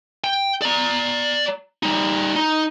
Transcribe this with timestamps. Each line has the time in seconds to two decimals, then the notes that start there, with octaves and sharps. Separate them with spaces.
0.24 G5
0.62 D5 A#5
1.83 G3 D#4
2.36 D#4